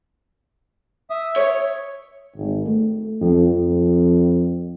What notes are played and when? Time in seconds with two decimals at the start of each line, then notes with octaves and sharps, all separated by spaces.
1.10 E5 D#6
1.36 C#5
2.36 G#1
2.66 A3
3.21 F2
3.53 F2